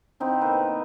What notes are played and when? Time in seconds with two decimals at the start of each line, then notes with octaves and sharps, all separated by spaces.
0.20 D3 C4 D#4 E4
0.41 B2 A#3 B4 A#5